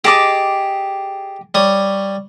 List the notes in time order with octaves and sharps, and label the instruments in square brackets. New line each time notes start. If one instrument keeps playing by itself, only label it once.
[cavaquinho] G4 D#5 D6 [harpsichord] G#4 A5
[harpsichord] G3 C#5 D#6